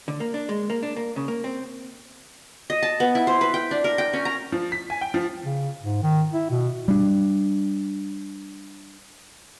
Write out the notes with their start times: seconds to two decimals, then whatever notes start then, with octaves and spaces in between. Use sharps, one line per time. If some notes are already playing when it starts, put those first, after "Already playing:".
0.08 D3
0.20 A#3
0.34 D4
0.49 G#3
0.70 A#3
0.83 D4
0.96 A#3
1.16 C#3
1.28 A#3
1.44 C4
2.70 D#5
2.82 A5
3.00 B3
3.15 E4
3.27 C5
3.41 B4
3.54 G5
3.71 D4
3.84 A#4
3.98 G5
4.13 C#4
4.25 A#5
4.52 F3
4.72 B6
4.90 G#5
5.01 G5
5.14 F3
5.45 C#3
5.83 G#2
6.03 D#3
6.33 E4
6.51 B2
6.88 G3 D4